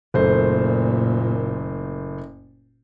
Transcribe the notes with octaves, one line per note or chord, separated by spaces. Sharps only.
F#1 A#2 A3 C5